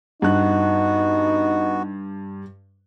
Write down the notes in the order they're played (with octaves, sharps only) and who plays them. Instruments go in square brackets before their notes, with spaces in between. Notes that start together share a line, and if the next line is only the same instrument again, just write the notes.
[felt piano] G2 F#6 [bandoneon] B3 F#4 [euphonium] D#4